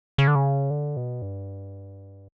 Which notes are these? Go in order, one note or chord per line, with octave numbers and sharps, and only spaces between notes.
C#3
D3
C#3
D3
B2
G2